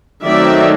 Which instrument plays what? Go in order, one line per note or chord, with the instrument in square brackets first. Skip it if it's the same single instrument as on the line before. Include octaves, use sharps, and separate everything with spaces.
[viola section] D#3 F#3 A3 C4 D#4 D5 E5